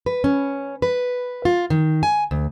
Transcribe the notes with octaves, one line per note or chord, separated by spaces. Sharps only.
B4
C#4
B4
F4
D#3
G#5
D2